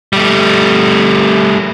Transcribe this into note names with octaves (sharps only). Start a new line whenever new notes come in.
G3 A3